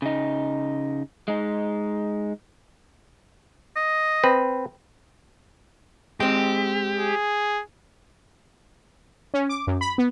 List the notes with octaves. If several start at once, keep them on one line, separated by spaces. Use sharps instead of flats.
C#3 D#4
G#3 D#4
D#5
C4 B4
G#3 C4 G4
G#4
C#4
D6
F#2
B5
B3